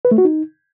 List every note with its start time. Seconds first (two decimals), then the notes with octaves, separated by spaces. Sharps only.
0.05 B4
0.11 A3
0.18 F#4
0.25 D#4